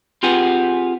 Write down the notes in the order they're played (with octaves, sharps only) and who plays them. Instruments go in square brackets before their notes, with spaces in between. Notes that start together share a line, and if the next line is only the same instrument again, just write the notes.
[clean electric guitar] C4 F4 G4 G#4 B4 F#5